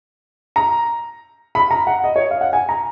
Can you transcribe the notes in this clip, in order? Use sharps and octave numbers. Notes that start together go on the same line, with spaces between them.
A#5
B5
A#5
F#5
D#5
C#5
F5
F#5
G#5
A#5